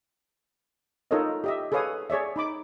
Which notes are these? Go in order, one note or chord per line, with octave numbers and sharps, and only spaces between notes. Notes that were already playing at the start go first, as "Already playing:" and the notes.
D#4 F4 A4 A#4 C#5 D#5
G4 D#5 E5
G#4 A4 B4 C#5 F5 D#6
G#4 C#5 D5 E5
D#4 B5 D6